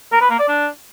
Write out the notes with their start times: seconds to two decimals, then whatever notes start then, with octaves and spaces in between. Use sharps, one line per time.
0.12 A#4
0.21 B4
0.30 A#3
0.39 D5
0.48 D4